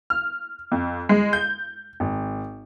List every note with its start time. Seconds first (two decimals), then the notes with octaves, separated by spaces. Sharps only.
0.10 F6
0.72 F2
1.09 G#3
1.33 G6
2.00 G#1